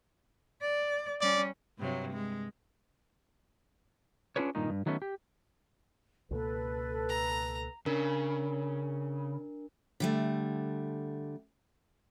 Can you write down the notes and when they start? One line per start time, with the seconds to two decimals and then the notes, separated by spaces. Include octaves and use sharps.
0.62 D5
1.21 G3 C#4 D5
1.78 G2 C3 F#3
2.13 G#3
4.36 C#4 D4 F4 G#4 B4 C#5
4.55 G2 A#2 D#3 D#4
4.70 G2
4.86 D#3 F#3 A3 B3 C#4
5.02 G4
6.31 C#2 B2 A#3 A4 B4
7.09 A#5
7.86 C#3 D4 A#4
10.00 D3 G3 A3